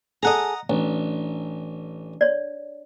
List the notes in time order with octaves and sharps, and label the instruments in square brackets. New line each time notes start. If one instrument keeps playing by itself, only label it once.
[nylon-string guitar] G#4 A4 [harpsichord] D#5 F#5 A#5
[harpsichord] A1 [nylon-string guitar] D4
[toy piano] C#5 D5